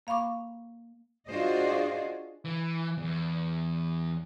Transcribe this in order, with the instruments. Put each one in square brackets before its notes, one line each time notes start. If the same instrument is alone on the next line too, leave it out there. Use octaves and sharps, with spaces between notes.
[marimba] A#3 F5 B5 C#6 D6
[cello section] D4 F4 F#4 G#4 C5 D#5
[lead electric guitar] E3
E2